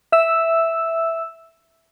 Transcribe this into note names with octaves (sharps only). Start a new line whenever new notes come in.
E5 E6